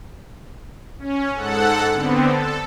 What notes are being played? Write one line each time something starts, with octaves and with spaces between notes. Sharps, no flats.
C#4
G#2 A4 F#5
D3 B3 C4
A4